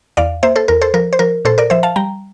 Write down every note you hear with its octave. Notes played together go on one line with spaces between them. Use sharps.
E2 D5 F5
A#3 C5 E5
A4 C5
E2 A#4
A4 C5
F3 A#4
C5
F3 A#4
A#2 A4 C5
A#4 D5
F3 C5 E5
F5 A5
G3 G5 A#5